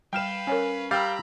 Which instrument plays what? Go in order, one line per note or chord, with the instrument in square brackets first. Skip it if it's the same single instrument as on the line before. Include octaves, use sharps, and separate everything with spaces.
[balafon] G3 [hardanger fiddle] B4 F5 [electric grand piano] G5 F6 E7
[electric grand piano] C#4 [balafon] A#4 C#5 G#5
[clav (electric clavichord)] G3 [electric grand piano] F5 G5 E6 [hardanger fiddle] A#5 B5